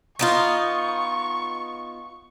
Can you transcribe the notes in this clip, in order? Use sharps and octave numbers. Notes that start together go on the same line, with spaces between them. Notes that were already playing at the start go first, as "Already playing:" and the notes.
B3 D#4 F4 C#6